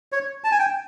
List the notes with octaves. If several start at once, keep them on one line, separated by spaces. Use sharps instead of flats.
C#5
A5
G#5
G5